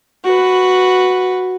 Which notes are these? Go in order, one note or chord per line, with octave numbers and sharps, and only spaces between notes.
F#4 B4